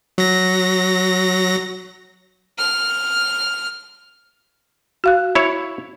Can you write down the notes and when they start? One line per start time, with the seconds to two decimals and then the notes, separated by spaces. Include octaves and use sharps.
0.18 F#3 A#6
2.58 F6
5.04 F#4 F5 F#6
5.35 E4 C#5